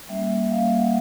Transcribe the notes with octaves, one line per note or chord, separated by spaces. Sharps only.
G3 A#3 C#4 E5
G3 A#3 C#4 F5
F#5